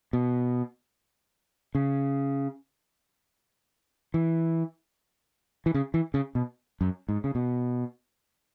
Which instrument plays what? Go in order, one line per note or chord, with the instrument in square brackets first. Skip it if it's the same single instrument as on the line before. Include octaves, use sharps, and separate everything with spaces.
[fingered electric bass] B2
C#3
E3
E3
C#3
E3
C#3
B2
F#2
G#2
C#3
B2